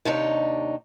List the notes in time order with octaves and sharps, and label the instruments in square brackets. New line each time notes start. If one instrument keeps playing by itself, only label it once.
[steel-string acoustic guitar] D#2 C3 D4 D#4 C#5